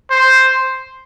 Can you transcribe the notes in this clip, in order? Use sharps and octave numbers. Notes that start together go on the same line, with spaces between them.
C5